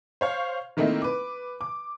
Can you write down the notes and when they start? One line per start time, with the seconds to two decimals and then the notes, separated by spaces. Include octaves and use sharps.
0.21 C5 C#5 F5
0.77 D#3 A3 A#3 C4 D#4 E4
1.02 B4 D6
1.61 D6